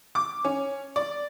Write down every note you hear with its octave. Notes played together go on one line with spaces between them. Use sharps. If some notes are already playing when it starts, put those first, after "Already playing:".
D6
C#4
D5